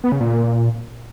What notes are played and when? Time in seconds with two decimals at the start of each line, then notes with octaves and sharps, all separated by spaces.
0.04 B3
0.12 C#3
0.20 A#2